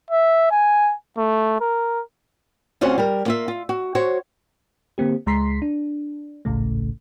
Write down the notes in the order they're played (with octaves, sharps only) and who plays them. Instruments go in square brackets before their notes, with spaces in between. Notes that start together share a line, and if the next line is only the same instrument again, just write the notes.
[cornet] E5
G#5
A3
A#4
[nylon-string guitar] D2 C4 C#4 F4 F#4 F#5
G3 A#4
A#3 F4 E5
F4
F#4
F#4 C5 C#5
[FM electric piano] D3 A#3 C4 G4
C#2 G#3 A#5 C6 B6 C7
D4
G#1 C#2 A2 C#3 A3